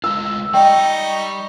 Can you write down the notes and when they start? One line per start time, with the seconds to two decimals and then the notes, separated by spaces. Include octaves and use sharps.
0.04 G#3 F4 E6
0.54 G3 D#4 D5 D#5 G5 C#6